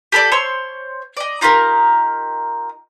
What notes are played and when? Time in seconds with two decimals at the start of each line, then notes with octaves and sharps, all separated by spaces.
0.12 G4 A4 A#4 D5
0.32 C5 C#5 C6 E6
1.17 D5 D#5
1.41 D#4 F4 G4 A#4